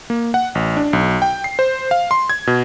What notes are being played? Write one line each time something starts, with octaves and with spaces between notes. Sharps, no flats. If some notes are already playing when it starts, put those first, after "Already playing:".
A#3
F#5
A1
D4
B1
G5
C7
C5
F5
C6
G#6
B2